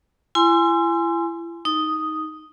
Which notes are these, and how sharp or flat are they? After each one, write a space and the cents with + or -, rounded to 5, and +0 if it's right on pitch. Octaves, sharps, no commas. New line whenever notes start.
E4 +40 G#5 +0 C6 -10
D#4 +10 D#6 +0